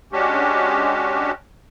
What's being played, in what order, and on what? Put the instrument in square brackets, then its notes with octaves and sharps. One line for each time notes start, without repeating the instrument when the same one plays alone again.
[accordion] G#3 C#4 D4 F#4 G4